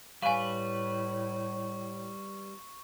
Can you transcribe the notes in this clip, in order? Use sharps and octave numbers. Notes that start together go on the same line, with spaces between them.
A2 G3 B4 F5 G#5 C#6